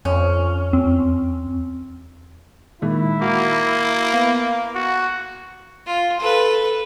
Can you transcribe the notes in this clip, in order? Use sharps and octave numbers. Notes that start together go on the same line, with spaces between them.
F2 C#4
E2 C4
A#2 D#3 G#3 E4
A#3 F#4
B3 F5
F#4
F4
A4 B4